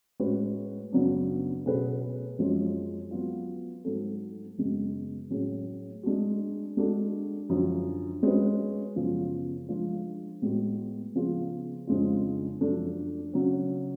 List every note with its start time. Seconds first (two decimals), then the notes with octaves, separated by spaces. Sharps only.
0.20 A2 G#3 C#4 F#4 B4
0.92 F#2 C#3 F#3 B3 D4
1.66 B2 A3 C#4 G#4 B4
2.38 F#2 F3 G#3 C#4
3.11 F#3 B3 F4
3.85 G#2 F#3 A3
4.58 F#2 C#3 G#3 B3
5.30 A2 F#3 C#4 G#4
6.03 G#3 D4 F#4
6.77 G#3 D4 F#4 A4
7.49 F#2 D3 F3
8.23 G#3 C#4 F#4 B4
8.96 F#2 C#3 F3 B3 F4
9.69 F3 G#3 D4 F4
10.42 A2 G#3 B3 F#4
11.15 C#3 F3 B3 F4 G#4
11.87 F2 C#3 G#3 D4 F4
12.61 F#2 F3 A3 D4
13.33 C#3 F#3 C#4